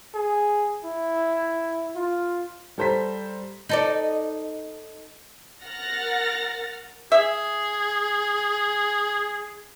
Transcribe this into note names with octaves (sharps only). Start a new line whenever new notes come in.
G#4
E4
F4
G3 A4 C5 A#5 B6
D#4 A4 D5
A#4 F#5 F6 A6 A#6
G#4 E5